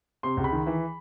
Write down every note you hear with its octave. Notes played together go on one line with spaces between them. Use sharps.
C3 C6
C#2
B5
D#3
E3